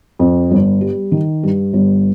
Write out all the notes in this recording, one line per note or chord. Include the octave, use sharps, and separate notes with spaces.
F2
G1
G3
D#3
G2
G1